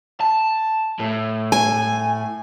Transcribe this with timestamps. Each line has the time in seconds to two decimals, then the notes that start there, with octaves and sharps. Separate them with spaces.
0.21 A5
1.00 A2
1.52 G#5